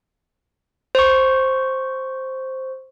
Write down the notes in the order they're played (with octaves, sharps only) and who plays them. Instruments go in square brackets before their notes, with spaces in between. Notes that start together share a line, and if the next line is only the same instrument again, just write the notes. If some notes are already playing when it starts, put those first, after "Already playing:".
[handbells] C5 C#6